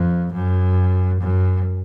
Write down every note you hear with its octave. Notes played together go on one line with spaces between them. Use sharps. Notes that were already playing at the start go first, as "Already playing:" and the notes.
Already playing: F2
F#2
F#2